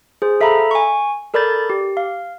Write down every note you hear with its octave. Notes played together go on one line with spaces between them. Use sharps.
G#4 C5
A4 E5 F5 A#5 B5
G#5 C#6
A4 A#4 D5 B5 G6 A6
G4
F5